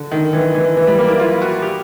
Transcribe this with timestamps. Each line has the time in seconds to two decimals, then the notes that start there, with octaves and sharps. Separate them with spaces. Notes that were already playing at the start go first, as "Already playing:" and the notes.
Already playing: D3
0.12 D#3
0.33 E3
0.54 E3
0.77 E3
0.87 G3
0.99 A#3
1.08 E4
1.20 F4
1.42 F#4
1.62 G4